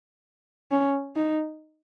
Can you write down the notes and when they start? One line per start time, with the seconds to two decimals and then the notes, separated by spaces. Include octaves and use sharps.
0.71 C#4
1.16 D#4